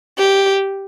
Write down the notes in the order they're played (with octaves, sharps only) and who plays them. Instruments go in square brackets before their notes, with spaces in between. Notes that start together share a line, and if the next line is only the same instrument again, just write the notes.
[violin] G4